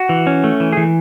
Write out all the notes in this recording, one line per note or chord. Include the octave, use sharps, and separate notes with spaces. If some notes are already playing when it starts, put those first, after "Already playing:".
Already playing: F#4
E3
C#4
A3
E3
E3 G#4